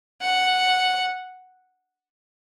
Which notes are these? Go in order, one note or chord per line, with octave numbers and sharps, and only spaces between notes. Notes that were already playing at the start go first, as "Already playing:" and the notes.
F#5